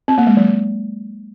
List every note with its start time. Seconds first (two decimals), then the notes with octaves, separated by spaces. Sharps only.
0.08 C4
0.18 A#3
0.27 G#3
0.37 F#3